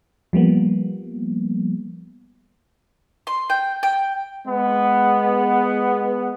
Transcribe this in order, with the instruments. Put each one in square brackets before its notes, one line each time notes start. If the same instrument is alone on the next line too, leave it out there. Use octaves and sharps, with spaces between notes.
[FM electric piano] F3 G3 A#3 B3
[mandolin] C6
G5
G5
[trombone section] G#3 B3